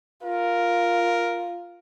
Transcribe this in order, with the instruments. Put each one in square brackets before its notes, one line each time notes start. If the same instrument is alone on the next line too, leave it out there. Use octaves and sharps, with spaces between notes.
[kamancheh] F4 [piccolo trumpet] A#4